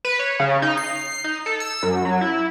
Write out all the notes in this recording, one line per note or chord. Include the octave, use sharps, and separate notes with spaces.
B4
C#5
C#3
D#4
C7
D#4
A4
E6
F#2
F#3
E4